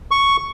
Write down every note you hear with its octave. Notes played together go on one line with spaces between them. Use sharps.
C#6